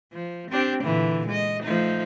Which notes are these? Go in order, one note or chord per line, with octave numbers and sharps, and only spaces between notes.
F3
C4 D4 G4
A#2 D3 E3
G#3 D#5
F3 A3 D#4